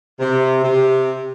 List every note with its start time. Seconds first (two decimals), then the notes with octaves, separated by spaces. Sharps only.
0.19 C3
0.63 C3